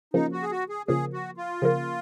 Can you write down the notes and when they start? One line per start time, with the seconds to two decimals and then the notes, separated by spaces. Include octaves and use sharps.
0.14 C#3 F3 A#3 D#4
0.32 F#4
0.42 G#4
0.51 F#4
0.69 G#4
0.88 C#3 F3 A#3 G#4
1.13 F#4
1.37 F4
1.62 C#3 F3 A#3